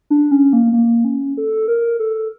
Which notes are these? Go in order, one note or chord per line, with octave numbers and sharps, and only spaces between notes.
D4
C#4
A#3
A#3
C#4
A4
A#4
A4